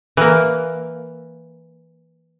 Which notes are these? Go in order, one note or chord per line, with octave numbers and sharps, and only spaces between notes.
E3 A#3